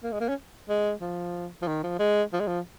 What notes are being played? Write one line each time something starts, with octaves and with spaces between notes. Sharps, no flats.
A#3
G#3
A#3
C#4
G#3
F3
F3
D#3
F3
G#3
F3
G#3
F3